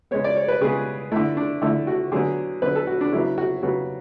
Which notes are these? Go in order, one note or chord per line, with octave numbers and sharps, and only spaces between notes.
C#3 G#3 B3 C#5
D5
C#5
B4
C#3 G#3 B3 G#4
D3 A3 E4
D4
D3 A3 E4
F#4
D3 F#3 B3 G#4
D3 F#3 B3 B4
A4
F#4
D4
C#3 F#3 B3 E4
F#4
C#3 F#3 B3 F#4